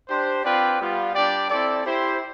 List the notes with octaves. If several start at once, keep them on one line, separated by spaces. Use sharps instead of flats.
D4 G4 C5
C4 F4 B4 D5 G5
G3 B3 F4
G3 D4 G4 D5 G5
C4 E4 A4 D5
E4 G4 C5